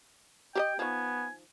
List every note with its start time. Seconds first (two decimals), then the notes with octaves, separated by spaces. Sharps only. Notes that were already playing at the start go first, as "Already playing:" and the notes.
0.55 G4 C5 D#5 G5
0.79 D#3 F3 B3 G#5